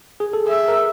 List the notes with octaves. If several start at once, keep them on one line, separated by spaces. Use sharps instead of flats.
G#4
A4
G#4 E5
A#4